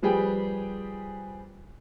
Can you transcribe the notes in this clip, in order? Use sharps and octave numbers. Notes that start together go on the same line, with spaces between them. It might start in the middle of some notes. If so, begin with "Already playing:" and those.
F3 G3 G4 G#4 B4 G5